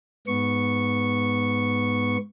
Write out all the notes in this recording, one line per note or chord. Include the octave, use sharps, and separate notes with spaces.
G#2 B3 C#6